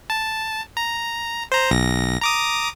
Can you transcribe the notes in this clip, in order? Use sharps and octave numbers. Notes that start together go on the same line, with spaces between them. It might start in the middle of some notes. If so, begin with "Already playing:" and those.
A5
A#5
C5 A#5
B1 A#6
A#5 D6 D#6